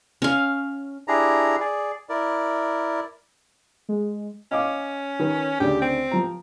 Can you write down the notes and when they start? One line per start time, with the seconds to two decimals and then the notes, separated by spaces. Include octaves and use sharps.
0.22 C#4 F5
1.08 D4 E4 G4 G#4 A#5
1.60 G#4 D5
2.09 E4 A#4 D5
3.89 G#3
4.52 C#4 D#5 F5 D6
5.19 D#3 B4
5.60 D2 C#3 G4 D5
5.82 C4
6.11 F3 A#5